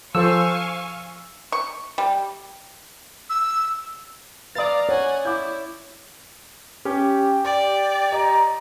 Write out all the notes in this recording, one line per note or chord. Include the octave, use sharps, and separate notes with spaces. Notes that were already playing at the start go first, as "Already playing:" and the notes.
F3 A4 C5 F5 G#5 C#6 E6
C#6
G3
E6
B4 D5 F5 A#5 D#6 A6
C#5 F#5 G#5
E4 D6 G6
C#4 G4
D5 G5
D#5 A#5